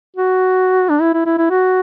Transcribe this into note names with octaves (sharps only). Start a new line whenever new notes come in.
F#4
D4
E4
E4
E4
E4
F#4